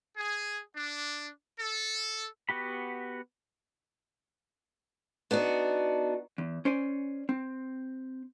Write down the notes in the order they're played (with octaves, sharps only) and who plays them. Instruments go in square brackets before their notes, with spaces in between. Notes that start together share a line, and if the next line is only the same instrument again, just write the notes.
[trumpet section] G#4
D4
A4
[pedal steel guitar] B3 F#4 G4 B5
[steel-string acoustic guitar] B3 D4 D#4 F#4
[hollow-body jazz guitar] E2
C#4 C5 D5 G#5
C4